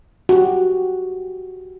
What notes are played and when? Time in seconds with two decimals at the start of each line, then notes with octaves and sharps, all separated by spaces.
0.29 F#4 G4